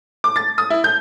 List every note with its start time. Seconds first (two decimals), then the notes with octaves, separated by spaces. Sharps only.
0.24 D6
0.36 A6
0.58 D#6
0.70 E4
0.84 G6